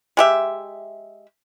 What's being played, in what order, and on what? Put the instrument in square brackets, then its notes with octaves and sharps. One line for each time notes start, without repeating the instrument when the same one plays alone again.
[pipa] G#3 G4 E5